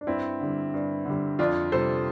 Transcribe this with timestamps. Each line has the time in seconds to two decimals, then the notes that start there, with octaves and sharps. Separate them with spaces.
0.01 D4
0.07 G2 C4 E4
0.41 D3 G3
0.74 G2
1.05 D3 G3
1.39 F2 D4 F4
1.72 C3 G3 A4 C5